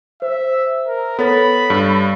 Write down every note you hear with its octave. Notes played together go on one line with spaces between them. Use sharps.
C5 E5
A#4
B3 A4 C#5 B5 A6
G2